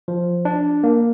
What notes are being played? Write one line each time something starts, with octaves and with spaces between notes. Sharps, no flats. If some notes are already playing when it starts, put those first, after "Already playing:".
F3
D4
A#3